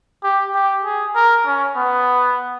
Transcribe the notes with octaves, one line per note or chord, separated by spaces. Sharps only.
G4
G4
G#4
A#4
C#4
B3